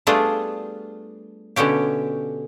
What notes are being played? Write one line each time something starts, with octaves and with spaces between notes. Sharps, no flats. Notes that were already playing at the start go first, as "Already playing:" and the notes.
G3 A3 B3 D4 F4 G#4
B2 D3 B3 C#4 G4